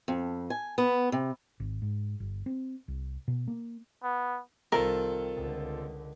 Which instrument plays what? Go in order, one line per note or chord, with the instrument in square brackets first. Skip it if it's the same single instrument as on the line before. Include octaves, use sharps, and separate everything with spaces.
[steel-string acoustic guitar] F2
G#5
B3
C3
[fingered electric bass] G#1
G#2
G1
C4
C2
B2
A#3
[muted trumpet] B3
[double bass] C2 [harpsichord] D#3 [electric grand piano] C4 F4 A4 [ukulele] A#4
[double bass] C#2 D3